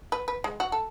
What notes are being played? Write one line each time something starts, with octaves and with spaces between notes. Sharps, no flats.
B4
B4
G#3
F#4
A4